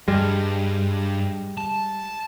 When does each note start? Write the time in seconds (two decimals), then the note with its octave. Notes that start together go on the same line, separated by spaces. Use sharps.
0.08 G2 G3 G#3
1.58 A5